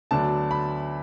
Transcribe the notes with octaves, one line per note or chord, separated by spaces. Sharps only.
D2 D3 F#3 B3 D4 A5
B5